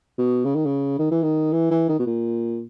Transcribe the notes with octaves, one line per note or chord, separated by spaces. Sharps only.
B2
C#3
D#3
C#3
D#3
E3
D#3
E3
E3
D#3
B2
A#2